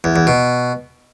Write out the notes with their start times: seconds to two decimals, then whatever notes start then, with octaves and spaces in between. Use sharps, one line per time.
0.04 E2
0.16 E2
0.27 B2